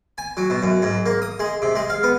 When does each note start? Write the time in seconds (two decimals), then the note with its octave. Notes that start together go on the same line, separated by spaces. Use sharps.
0.18 G#5
0.37 F#3
0.50 B2
0.63 F#2
0.82 G#2
1.06 A#3
1.22 D#6
1.40 G#3
1.62 C3
1.75 G#3
1.90 F5
2.03 B3